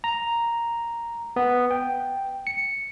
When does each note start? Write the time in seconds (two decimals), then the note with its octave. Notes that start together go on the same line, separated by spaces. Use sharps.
0.04 A#5
1.36 B3
1.71 G5
2.47 C#7